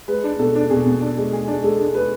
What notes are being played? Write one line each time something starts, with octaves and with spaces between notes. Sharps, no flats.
G#3 B4
D4
B2 A4
D4
B2 G#4
B2
D4
G#3
G#3 G#4
D4
G#3 A4
D4
G#3 B4